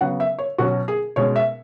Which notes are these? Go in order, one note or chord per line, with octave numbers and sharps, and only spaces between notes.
C#3 F#3 B3 F#5
E5
C#5
B2 F#3 C#4 F#4
G#4
B2 G#3 C#4 C#5
E5